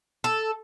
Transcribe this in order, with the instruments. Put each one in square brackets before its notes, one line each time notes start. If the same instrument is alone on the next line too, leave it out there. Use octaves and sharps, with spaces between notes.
[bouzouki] A4